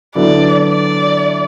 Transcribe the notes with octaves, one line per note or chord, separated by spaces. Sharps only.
D3 F#3 B3 E4 D5
D5